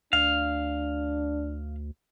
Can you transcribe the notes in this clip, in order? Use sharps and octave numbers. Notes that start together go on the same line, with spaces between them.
D2 D4 F5